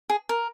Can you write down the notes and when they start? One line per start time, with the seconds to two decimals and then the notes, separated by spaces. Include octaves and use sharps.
0.10 G#4
0.29 A#4